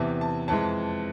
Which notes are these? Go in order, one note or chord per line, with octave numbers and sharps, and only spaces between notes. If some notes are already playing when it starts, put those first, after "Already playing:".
Already playing: E2 C3 E3 A5
A5
F2 E3 G#3 A5